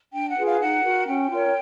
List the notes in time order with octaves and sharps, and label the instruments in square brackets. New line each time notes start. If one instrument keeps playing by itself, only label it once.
[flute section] D4 G5
F#5
F4 G#4 B4
F5
D#4 F#5
F#4 A#4
C#4 G5
F4 A#4 C#5